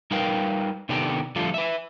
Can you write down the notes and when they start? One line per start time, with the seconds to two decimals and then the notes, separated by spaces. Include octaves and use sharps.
0.11 G3 D#4 A#4 B4 F5 G5
0.89 C3 D#3 B3 D4 G4 A4
1.36 D3 F3 G3 A3 F4 A4
1.54 B4 E5